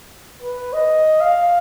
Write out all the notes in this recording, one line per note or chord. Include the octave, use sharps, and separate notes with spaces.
B4
D#5
F5